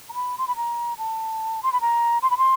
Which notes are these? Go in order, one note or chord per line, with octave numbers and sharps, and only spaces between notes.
A#5
B5
C6
B5
A#5
A5
C6
B5
A#5
C6
B5
C6